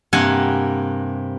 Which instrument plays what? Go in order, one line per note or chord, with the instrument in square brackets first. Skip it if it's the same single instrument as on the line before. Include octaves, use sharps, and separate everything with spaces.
[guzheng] G2 C3 A#3 F#5 G#5